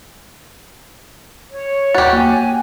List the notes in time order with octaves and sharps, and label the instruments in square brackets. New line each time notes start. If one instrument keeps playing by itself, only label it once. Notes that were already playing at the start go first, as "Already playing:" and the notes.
[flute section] C#5
[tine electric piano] D#2 A6 [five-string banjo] F#4 G4
[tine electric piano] A#3 [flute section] G#5